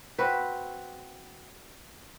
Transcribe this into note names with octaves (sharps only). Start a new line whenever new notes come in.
C4 F#4 B4